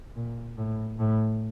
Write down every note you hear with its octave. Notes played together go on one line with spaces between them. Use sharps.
A#2
A2
A2